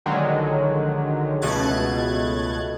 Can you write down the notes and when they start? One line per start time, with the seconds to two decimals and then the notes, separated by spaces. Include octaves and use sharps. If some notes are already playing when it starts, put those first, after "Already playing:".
0.06 A#1 D3 D#3 F#3 G#3
1.42 C#2 B2 A3 F#6 G#6 A6